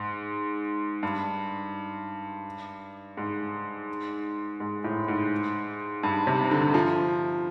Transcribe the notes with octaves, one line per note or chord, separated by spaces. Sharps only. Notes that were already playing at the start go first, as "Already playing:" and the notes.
Already playing: G#2
G2
G#2
G#2
A2
G#2
G2
C3
D3
F3